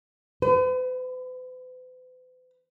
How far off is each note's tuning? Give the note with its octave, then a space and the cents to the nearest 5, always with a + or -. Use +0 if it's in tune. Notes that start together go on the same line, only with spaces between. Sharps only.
B4 +45